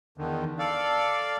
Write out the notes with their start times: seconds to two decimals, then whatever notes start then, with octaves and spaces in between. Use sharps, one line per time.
0.18 E2 D3 D#3
0.59 A4 D5 F5